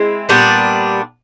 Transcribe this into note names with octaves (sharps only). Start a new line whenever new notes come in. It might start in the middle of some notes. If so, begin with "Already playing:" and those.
Already playing: G#3 C4 E4
A#2 G3 B3 D4